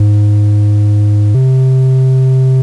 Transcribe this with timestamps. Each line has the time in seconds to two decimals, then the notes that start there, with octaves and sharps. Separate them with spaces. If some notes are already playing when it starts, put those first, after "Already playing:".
Already playing: G#2
1.35 C3